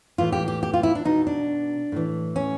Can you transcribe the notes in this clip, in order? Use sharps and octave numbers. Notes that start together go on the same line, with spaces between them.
A2 E3 F4
G4
G4
G4
F4
E4
D4
B2 D#4
D4
A2 E3
C#4